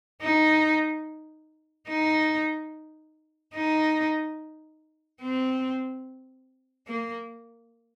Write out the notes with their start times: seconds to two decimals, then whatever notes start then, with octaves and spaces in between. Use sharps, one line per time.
0.22 D#4
1.88 D#4
3.55 D#4
5.21 C4
6.87 A#3